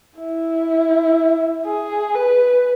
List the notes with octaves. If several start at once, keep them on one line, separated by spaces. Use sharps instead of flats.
E4
G#4
B4